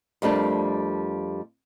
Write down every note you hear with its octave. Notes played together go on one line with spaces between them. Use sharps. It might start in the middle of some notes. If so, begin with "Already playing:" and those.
F2 G3 A3 D4 A#4